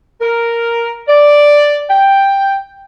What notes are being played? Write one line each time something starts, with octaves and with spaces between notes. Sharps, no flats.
A#4
D5
G5